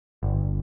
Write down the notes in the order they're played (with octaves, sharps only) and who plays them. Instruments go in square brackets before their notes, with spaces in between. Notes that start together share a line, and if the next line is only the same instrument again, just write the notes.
[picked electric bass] G1